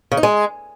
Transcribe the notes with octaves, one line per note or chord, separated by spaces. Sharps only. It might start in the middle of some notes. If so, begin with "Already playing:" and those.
C#3
D#4
G#3